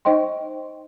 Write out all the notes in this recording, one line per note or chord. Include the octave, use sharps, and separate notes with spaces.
D#4 C5 D#5 G5 C6